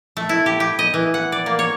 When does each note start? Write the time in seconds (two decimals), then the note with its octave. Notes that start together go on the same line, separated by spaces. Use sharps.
0.17 A3
0.29 E4
0.46 G4
0.60 G4
0.79 D#5
0.94 E3
1.14 F#5
1.32 D5
1.46 A#3
1.59 C#5